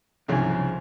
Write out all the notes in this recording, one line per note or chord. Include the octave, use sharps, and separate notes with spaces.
C2 G#2 C#3 F3 G#5